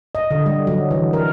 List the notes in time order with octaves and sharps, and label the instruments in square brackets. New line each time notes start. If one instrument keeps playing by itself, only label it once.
[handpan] D#5
D3
G3
F#3
E3
A#4